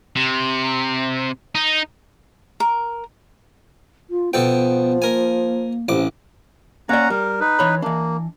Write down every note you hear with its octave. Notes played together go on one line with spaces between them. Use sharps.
C3
D#4
A#4
F4
B2 F3 B3 A4 G5
A#3 A#4 G#5
A1 C3 C#4 D6
A#3 C#4 D5 F#5 A#5
G3 A#4
D#4 B4
E3 C#5 B5
E3 A#3 D4